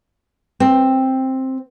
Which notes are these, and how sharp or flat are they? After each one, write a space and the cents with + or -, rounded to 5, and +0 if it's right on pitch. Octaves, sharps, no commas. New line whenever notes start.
C4 +10